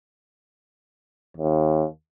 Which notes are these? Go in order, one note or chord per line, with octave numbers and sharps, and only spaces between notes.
D#2